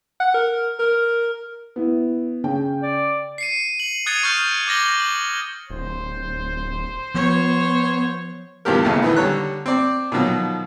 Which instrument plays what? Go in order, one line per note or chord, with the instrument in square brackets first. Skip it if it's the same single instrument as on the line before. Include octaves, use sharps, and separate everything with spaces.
[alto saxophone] F#5
A#4
A#4
[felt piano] B3 E4
C#3 C#4 G5
[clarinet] D5
[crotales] C7 C#7 D#7
F#7
D#6 F#6 G#6 A6 C#7 D#7
C#6 D#6 F6 G6
D6 F6 A6 A#6 F#7 G7
F#7
[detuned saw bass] D1 [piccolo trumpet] C5
[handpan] F3 [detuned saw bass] B3 [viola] C#5
[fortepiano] E2 G2 D#3 F3 G4 A#4
A#1 E2 A2 C#3 A3
D#3 E3 B3
D3 G3 C#5 A#5 F#6
C4 D5
B2 D#3 F3 F#3